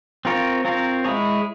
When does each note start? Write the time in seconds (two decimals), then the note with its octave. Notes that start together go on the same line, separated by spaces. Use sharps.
0.25 C4 F4 A#4 C#5
0.65 C4 F4 A#4 C#5
1.04 G#3 E4 G#4 C#5